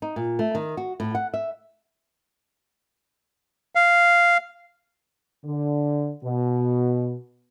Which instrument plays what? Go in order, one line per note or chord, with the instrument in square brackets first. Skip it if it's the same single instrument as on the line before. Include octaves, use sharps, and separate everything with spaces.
[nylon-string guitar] D#4
A#2
A3
D#3
F#4
A2
F#5
E5
[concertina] F5
[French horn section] D3
B2